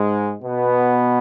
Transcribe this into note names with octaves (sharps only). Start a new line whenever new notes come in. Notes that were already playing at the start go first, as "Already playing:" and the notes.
Already playing: G#2 G#3
B2 B3